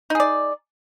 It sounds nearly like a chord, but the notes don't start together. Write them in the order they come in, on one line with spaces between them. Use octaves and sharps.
D#4 G#4 D5